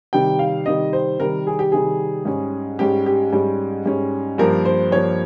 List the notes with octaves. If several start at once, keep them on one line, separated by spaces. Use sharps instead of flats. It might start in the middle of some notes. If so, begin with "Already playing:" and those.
C3 D#3 G3 G5
F5
C3 D#3 G3 D#5
C5
C3 D#3 G3 A#4
G#4
G4
C3 D#3 G3 G#4
G#2 G3 C#4
G#2 G3 C#4 G4
G4
G#2 G3 C#4
G#2 G3 C#4
G2 F3 A#3 A#4
C5
G2 F3 A#3 C#5